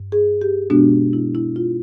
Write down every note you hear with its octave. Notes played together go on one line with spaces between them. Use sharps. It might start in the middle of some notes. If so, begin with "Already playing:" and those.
Already playing: G2
G#4
G4
B2 G#3 B3 D4 F#4
E4
E4
F4